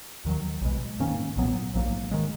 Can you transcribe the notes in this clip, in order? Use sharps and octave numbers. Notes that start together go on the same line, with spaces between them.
D#2 D#3 F#3
B1 B2 G#3
G#2 D#3 A#3 C#4
B1 A#2 F#3 B3
A#1 G#2 F#3 A#3
D#3 G#3